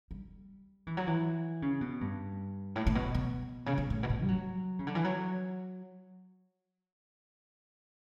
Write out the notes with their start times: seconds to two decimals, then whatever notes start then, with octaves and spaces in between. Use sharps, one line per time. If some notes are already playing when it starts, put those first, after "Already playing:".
0.11 G3
0.87 E3
0.97 F#3
1.07 E3
1.62 C#3
1.81 B2
2.01 G2
2.76 A2
2.87 A2
2.95 B2
3.15 B2
3.66 C#3
3.78 B2
3.90 A2
4.03 B2
4.10 A2
4.22 G3
4.28 F#3
4.79 C#3
4.87 D3
4.95 E3
5.04 F#3